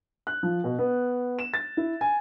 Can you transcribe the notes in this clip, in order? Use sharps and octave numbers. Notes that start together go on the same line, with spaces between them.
F#6
F3
B2
B3
E7
A6
E4
G#5